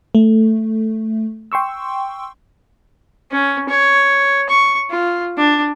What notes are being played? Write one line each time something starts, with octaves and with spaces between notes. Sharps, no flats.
A3
G5 C6 C#6 E6
C#4
C#5
C#6
F4
D4